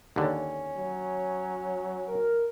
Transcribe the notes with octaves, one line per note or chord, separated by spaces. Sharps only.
D#2 D3 C#4
F#3
A#4